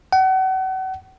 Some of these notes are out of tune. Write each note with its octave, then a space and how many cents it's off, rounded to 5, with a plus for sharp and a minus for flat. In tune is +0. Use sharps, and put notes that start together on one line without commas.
F#5 +35